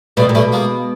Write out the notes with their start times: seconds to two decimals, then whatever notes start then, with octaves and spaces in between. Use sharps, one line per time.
0.17 B2 G3 A3
0.29 A#2
0.35 B2 G3 A3
0.52 G#3 A#3